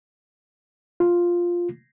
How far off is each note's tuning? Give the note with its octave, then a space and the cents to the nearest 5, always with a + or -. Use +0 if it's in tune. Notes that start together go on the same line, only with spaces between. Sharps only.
F4 +0